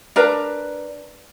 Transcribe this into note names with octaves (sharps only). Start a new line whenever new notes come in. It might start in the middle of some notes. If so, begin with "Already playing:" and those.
D4 A#4 B4 A#5